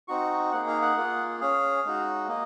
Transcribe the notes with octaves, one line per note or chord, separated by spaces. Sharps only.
C4 D#4 F#4 C#6
A#3 D#4 G#4 F#5
F5
F#5
A#3 F4 G#4
C#4 G#4 F5
G#3 D#4 F#4
A#3 D#5